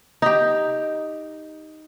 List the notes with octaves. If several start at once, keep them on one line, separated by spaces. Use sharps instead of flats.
D#4 G4